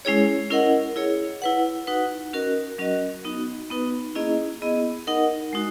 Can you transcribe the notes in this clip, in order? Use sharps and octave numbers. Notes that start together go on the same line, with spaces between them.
G#3 C#4 E4 G#4 C#5
C#4 E4 A#4 D#5 F#5
E4 G#4 C#5
E4 B4 F#5
D#4 F#4 B4 F#5
C#4 F#4 A#4 D#5
F#3 C#4 F#4 A#4 D#5
B3 D#4 F#4
B3 D#4 F#4 B4
A#3 C#4 E4 G#4 D#5
B3 E4 G#4 D#5
D#4 A#4 D#5 F#5
G#3 D#4 F#4